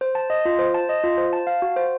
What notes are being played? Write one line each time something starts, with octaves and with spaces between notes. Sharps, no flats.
C5
A5
D#5
F4
C5
A5
D#5
F4
C5
A5
F5
F#4
C5